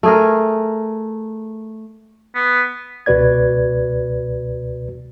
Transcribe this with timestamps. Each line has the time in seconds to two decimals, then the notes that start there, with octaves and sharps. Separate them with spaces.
0.03 A3 G#4 A#4
2.35 B3
3.06 C#2 B2 F#4 B4 D5 G#6